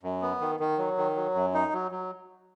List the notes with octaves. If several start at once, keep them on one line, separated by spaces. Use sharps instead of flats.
F#2
B3
D#3
D#3
F#3
D#3
F#3
F#2
D#4
F#3
F#3